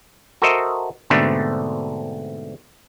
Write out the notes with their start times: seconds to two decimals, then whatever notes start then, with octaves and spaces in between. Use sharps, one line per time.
0.42 F#4 A4 A#4 C5 D#5 E5
1.10 G#2 B2 D3 A3 C4 D4